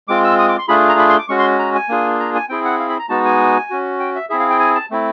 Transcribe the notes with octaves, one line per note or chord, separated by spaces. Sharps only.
G#3 C4 F4 D6
E6
D#6
D6
C6
A3 D4 F4 G#4 B5
A#5
B5
C6
D6
G#3 C#4 F#4 C#6
C6
A#5
G#5
A#3 D4 F4 G#4
A#5
G#5
C4 E4 G#4 G5
F#5
F5
B5
A#5
G#3 B3 D#4 F#4 A5
G#5
C#4 F#4
G5
E5
C4 E4 G#4 E5
F5
G5
G#5
A5
A3 C4 E4